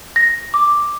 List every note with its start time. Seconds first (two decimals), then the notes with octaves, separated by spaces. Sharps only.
0.16 A#6
0.54 D6